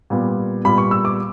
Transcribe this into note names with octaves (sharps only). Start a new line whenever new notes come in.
A#2 G3 B3
A#2 G3 B3 B5
C#6
E6
D6